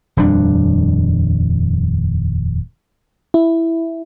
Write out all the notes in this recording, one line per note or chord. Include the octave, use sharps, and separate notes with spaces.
D#1 F2 G3 D4
E4